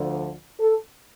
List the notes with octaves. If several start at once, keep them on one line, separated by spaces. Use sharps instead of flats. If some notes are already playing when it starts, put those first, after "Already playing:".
Already playing: D2 D3 F3
A4